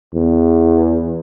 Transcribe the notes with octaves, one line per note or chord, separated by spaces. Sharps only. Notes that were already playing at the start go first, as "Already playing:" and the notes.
E2